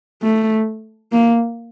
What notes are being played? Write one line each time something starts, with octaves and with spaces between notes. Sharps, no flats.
A3
A#3